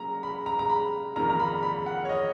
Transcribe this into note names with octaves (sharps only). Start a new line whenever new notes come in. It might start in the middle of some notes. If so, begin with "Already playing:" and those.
Already playing: C#3 F#3 A#3 A#5
B5
A#5
A#5
B5
F2 D#3 A#3 A#5
A#5
B5
B5
F#5
C#5
D#5